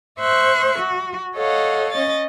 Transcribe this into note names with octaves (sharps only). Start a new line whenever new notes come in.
C5 E5 C#6 F#6
F#4
A4 C#5 D#5 F5 F#5
C#4 D#5 A6